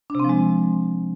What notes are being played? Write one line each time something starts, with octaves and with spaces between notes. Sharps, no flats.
C3 F3 G#3 C4 D4